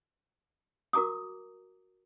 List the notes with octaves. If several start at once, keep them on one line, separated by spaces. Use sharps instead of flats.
F#4 A#4 A#5 D6 D#6